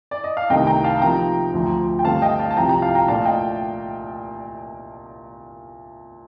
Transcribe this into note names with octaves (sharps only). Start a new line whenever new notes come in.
D5
D#5
F5
C2 C3 D#3 A3 D#4 D#5 G5
G5 A#5
F5 A5
C3 F3 A#3 D#4 G5 A#5
D2 D3 F3
G5
G2 D3 A3 C4 F5 A5
D#5 G5
F5 A5
A5
C2 C3 F3 G5 A#5
G5 A#5
F5 A5
G5 A#5
A#2 A3 D4 F5 A5
D#5 G5